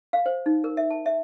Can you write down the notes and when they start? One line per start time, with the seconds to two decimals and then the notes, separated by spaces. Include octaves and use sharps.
0.13 F5
0.26 C5
0.46 D#4
0.64 A#4
0.77 E5
0.90 A5
1.06 E5